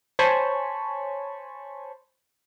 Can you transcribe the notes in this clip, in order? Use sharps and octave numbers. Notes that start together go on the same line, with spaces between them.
C5 C#5 G#5 A5 B5 C#6